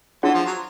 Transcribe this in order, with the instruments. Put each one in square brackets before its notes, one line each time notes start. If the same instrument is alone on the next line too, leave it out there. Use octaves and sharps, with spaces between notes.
[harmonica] E3 [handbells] D4 F4 G#4 C#5 F#5
[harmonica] F3
F#3